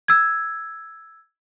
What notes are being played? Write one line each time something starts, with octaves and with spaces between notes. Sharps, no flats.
E6 G#6